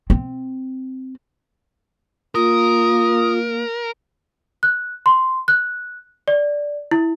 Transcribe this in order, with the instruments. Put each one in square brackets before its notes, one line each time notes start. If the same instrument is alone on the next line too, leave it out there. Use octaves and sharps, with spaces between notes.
[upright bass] C4
[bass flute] A#3 [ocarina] F4 [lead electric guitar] A#4 [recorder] D#6
[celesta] F#6
C6
F#6
D5
E4